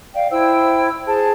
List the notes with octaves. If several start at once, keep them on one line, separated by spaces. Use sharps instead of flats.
D5 F5 G5
E4 C5 G5 E6
G#4 C5 A5 G#6